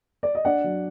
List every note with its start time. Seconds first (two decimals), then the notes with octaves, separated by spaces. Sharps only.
0.23 D5
0.35 D#5
0.45 D4 D5 F#5
0.64 F#3